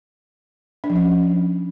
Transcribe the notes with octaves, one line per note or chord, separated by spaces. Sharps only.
D4
F3
C#4